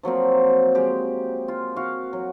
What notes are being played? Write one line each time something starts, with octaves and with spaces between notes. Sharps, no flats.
F3 F#3 A#3 C4
G#3 G4
F4
F#4 F5
F#3